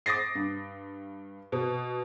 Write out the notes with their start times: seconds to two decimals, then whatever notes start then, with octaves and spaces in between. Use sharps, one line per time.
0.06 D6 D#6 A6 A#6 C7
0.35 G2
1.52 B2